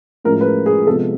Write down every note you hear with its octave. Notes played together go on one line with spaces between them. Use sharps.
A2 F3 G#3 C#4 A#4
B4
A#4
G#4
C3 F3 G#3 B3 A4